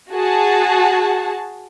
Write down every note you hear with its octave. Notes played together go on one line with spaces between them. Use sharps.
F#4 G#4 A5